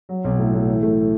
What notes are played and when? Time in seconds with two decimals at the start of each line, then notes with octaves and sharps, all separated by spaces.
0.09 F#3
0.24 B1
0.38 A2
0.53 A2
0.67 E3
0.83 A3